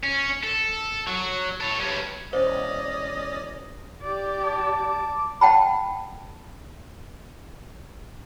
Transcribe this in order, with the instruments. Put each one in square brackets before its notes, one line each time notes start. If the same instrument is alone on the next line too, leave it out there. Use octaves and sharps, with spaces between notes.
[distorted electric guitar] C#4
A4
F#3
A4 C#5
G2 C#4
[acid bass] E1 [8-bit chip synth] C#4 D5 [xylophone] C5 [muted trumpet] D#5
[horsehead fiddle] G4 D5
[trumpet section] A5 D6
[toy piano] F#5 G5 A5 B5